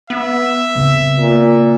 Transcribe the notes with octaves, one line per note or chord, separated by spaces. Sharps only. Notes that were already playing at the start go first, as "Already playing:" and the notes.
B3 E5
C#3 C4
A#2